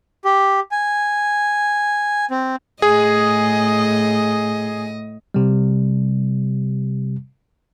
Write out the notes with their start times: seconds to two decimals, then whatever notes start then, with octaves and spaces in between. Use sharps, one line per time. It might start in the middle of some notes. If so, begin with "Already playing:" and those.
0.25 G4
0.71 G#5
2.31 C4
2.82 A2 G#4 D#5
5.34 C3 G3